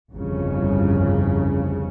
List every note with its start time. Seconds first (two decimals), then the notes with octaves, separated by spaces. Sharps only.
0.12 G1 C2 F2 C#3